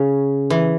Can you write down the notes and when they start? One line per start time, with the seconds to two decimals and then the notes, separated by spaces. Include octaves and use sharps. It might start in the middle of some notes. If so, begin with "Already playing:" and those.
Already playing: C#3
0.50 E3